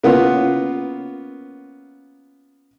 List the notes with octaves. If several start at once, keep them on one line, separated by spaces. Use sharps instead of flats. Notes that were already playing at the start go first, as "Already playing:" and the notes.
A#3 B3 C#4 F4